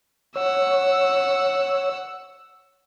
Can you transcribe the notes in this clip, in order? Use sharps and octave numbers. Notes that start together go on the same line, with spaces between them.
C#5 F#5 E6